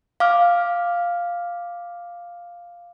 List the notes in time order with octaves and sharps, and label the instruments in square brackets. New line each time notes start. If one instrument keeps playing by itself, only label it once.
[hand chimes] F5 D6 F6